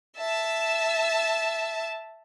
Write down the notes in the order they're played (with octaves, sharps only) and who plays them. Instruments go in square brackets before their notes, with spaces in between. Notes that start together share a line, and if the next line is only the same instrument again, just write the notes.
[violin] E5 A5